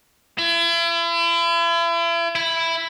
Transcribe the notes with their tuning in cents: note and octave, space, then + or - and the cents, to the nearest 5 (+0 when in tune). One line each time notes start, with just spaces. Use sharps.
E4 +40
E4 +5